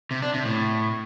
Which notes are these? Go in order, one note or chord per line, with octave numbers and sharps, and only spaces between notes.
C3
D4
C3
A2